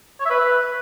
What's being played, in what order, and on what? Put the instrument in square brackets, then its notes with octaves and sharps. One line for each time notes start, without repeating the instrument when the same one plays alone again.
[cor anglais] C#5
E5
B4